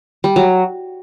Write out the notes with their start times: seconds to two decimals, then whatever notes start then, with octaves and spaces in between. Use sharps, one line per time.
0.24 G3
0.36 F#3